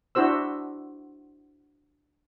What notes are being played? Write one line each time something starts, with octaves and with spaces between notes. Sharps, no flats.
D4 E4 F#4 C5 E6